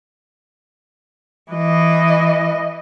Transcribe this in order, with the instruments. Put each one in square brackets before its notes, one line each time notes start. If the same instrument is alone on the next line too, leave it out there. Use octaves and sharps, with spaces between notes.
[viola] E3 D#5